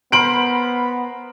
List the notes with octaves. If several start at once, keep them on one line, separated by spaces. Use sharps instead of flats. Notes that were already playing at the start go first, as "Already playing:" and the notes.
B3 A#4 C5 B5 C6 D7 F#7